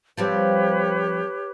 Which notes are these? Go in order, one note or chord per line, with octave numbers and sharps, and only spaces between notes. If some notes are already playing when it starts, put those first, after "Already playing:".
F3 G3 C4 G4 B4 C#5